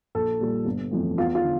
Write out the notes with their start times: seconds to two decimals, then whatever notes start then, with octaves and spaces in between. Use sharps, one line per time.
0.15 A#1 A4
0.41 A#2 G3
0.65 G1
0.91 F2 E3 A3
1.17 E2 F4
1.35 F4
1.44 D3